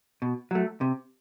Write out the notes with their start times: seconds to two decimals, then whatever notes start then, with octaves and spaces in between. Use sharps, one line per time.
0.22 B2
0.51 F#3 A3
0.81 C3